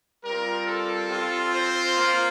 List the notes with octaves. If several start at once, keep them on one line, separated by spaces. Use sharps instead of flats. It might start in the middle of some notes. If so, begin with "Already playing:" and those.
G3 C4 F4 A#4
A4
C4 F4
C5
A#3 F4